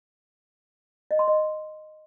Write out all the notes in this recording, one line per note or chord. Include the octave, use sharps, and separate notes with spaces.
D#5
C6
D#5